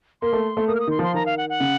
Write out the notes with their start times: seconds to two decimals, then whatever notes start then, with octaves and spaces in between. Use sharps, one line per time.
0.22 A#3 C6
0.33 A3
0.57 A3
0.68 A#3 D#6
0.75 F6
0.80 D#6
0.87 D#3 C6
0.99 F3 C6
1.14 D#3 A#5
1.26 F5
1.37 F#5
1.49 F#5
1.60 C#3